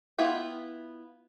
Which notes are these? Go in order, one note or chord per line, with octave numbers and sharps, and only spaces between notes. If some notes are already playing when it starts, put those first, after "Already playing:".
B3 E4 F4 E5 G5